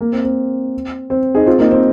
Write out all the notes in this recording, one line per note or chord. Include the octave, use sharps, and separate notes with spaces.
A#3
C4
C4
C4
D#4 G#4
C4 F4
A#3 D#4
C4